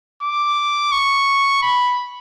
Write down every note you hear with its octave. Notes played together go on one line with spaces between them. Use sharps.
D6
C#6
B5